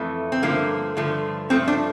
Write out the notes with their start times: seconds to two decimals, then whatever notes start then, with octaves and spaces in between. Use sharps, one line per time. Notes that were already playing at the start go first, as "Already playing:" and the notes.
Already playing: F2 E3 A3
0.32 C4
0.42 G2 D3 F3 A3 A#3
0.97 G2 D3 F3 A3
1.50 G2 F3 A3 C4
1.68 D4